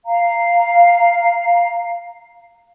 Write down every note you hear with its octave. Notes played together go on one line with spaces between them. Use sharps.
F5 A#5